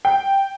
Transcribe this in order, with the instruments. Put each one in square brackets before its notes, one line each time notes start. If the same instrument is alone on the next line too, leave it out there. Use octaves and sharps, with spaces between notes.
[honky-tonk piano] G5